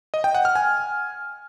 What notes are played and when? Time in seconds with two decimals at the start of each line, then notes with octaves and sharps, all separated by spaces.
0.14 D#5
0.24 G5
0.35 F#5
0.45 F6
0.55 G#5